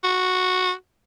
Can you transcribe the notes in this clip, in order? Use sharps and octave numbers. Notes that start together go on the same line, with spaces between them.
F#4